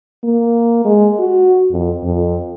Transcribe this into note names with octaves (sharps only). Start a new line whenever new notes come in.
A#3
G#3
F#4
F2
F2